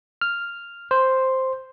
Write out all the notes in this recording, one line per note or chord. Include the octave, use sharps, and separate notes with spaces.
F6
C5